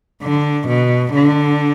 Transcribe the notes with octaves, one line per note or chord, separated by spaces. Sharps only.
D3
B2
D3